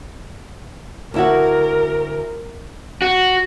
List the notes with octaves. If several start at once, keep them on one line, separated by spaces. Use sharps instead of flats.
D2 E4 F#4 A#4
F#4